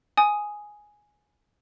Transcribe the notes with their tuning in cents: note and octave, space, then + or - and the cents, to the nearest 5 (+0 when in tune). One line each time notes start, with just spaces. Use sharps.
G#5 +5 D#6 +0